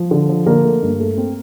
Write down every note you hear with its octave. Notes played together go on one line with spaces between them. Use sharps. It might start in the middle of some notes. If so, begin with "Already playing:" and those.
Already playing: F3
D3
F3
D3 A#3 A#4
A3
G2
A3
C4